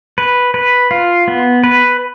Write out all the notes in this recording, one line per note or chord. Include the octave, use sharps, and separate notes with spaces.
B4
B4
F4
B3
B4